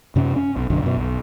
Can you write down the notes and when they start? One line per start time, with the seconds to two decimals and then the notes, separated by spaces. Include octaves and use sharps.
0.16 F#2 C3 C#4
0.36 C#4
0.56 B1
0.70 B1 F#2 D3
0.83 F#2 B2
0.97 B1